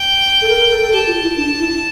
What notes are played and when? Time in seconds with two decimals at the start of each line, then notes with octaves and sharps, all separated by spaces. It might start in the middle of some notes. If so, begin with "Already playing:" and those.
Already playing: G5
0.42 A4
0.49 A#4
0.59 A#4
0.71 A4
0.81 A4
0.92 G4 A5
1.07 F4
1.22 E4
1.37 D4
1.59 E4